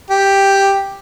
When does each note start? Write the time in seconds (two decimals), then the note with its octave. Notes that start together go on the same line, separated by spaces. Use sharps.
0.11 G4